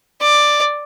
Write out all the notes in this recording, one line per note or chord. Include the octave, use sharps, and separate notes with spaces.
D5